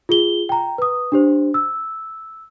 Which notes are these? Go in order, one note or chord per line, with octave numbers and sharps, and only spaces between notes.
F4 G#4 G7
G5 A#5
B4 D#6
D4 G4 C5
E6